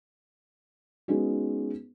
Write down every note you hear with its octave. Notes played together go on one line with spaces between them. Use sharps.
G#3 B3 C#4 D#4 F#4